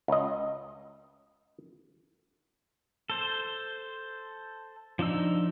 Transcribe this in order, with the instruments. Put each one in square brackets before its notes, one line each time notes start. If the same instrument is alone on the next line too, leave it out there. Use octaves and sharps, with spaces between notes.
[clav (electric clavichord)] C#2 D#5
[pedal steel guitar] A4 C5
F3 D4 D#4 E6